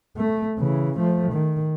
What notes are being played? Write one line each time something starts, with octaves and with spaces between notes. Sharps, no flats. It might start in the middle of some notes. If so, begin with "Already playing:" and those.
A3
C#3 E3
F3 A3
D#3